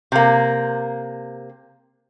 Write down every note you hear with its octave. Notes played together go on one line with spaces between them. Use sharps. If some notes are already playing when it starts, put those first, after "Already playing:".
C3 A#3